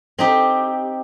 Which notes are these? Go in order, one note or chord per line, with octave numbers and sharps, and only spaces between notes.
C4 D#4 G4